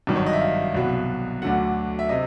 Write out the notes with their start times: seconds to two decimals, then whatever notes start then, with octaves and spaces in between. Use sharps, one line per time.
0.07 G#1 G2 D#3 F#3
0.16 C#5
0.26 D#5
0.33 E5
0.41 F5
0.75 C2 B2 F#3
1.42 D2 D3 F#3 F#5
1.99 E5
2.09 C3 D#5